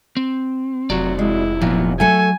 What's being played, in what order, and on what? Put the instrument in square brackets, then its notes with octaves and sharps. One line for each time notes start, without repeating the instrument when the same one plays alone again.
[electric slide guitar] C4
[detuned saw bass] F1 [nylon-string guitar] F#3 [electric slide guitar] C4 F#4 D5
[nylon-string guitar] G#3 [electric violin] E4
[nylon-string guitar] A#2 [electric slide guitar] F3 F#3 B3
[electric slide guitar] F#3 [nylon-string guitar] A3 A4 [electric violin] G#5